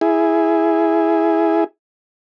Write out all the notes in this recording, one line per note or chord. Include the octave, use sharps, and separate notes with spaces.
E4 G#4